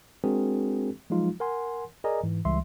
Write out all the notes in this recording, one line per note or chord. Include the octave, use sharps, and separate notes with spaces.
G#3 C4 D4 F#4 G#4 A#4
F3 F#3 G#3 D#4 F4
A#4 F#5 G#5 C6
G#4 A#4 D5 D#5 G#5 A#5
G#2 E3
C#2 E3 G3 G#3 E5 C6